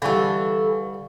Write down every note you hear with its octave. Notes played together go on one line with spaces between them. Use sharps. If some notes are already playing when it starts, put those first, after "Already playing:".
D3 E3 G3 A4 F5 G5 C#6